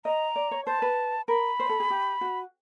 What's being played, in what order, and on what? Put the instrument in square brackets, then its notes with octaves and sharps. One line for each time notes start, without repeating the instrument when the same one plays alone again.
[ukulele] D#5 [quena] A#5
[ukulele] D5
C#5
[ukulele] C5 [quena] A5
[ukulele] B4
[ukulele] A#4 [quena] B5
[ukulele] C5
A4
G#4
G4
F#4